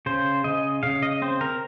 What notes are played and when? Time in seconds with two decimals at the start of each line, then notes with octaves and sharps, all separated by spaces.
0.06 C#3 C5
0.44 C#3 D#5
0.83 C#3 F5
1.02 D#5
1.22 C4 C5
1.41 A#4